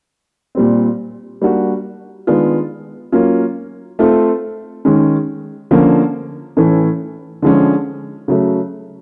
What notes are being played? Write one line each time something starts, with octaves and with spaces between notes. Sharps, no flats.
A#2 G3 C4
G3 A#3 D4 F#4
D#3 G#3 B3 D4 F4
F#3 A#3 C#4 F4
A3 C4 F4 A4
D#3 G#3 C#4
D3 F3 A#3 C#4
A2 E3 A3 C#4
D3 F3 G#3 C#4
C#3 F#3 A3